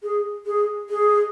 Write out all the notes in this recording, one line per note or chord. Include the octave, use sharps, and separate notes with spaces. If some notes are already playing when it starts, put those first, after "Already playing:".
G#4
G#4
G#4